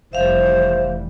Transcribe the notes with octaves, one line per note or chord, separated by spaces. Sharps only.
F1 E3 G3 C5 E5 F5